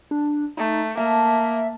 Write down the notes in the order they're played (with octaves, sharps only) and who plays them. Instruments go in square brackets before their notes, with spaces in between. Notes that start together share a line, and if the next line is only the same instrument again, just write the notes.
[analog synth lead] D4
[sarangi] A3 [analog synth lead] D#4
[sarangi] A#3 [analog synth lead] E5 [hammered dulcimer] A5